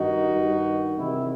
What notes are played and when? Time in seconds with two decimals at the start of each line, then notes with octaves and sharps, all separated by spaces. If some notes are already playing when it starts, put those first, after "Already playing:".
Already playing: G2 D#3 D#4 F#4
0.35 G2 D#3
0.97 E2 C3 D#3 E4 G4